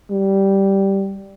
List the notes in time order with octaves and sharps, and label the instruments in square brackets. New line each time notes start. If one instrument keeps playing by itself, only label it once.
[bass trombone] G3